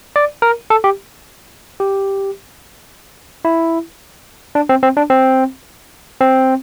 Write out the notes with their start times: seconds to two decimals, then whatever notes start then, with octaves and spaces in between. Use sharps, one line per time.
0.16 D5
0.42 A#4
0.70 A4
0.84 G4
1.80 G4
3.45 E4
4.55 D4
4.69 C4
4.83 C4
4.97 D4
5.10 C4
6.20 C4